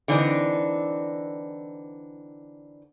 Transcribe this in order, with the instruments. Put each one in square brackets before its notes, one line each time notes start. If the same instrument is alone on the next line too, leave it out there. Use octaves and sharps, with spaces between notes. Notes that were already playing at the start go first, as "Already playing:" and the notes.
[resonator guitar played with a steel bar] D3 E3 C4 D4 D#4